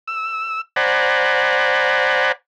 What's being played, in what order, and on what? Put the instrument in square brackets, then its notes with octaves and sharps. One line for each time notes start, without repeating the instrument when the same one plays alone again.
[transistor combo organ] E6
C5 D5 F#5 G#5 A#5 B5